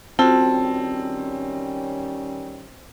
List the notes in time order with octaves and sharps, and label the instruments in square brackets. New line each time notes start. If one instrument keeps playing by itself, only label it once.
[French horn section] D#3 G3 C#4 [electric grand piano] C4 [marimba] F4 F#4 [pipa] A4